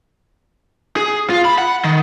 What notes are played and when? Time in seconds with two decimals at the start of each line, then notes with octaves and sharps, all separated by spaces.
0.96 G#4
1.30 F4
1.45 B5
1.58 F#5
1.84 D#3